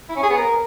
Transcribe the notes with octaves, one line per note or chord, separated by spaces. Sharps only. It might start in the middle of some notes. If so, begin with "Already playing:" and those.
E4
C#4
G#4
B3
A#4